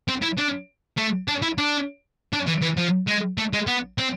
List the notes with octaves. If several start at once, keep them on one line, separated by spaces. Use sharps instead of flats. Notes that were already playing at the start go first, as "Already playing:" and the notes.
C4
E4
D4
A3
D4
E4
D4
D4
E3
E3
F3
G#3
A3
G#3
B3
C4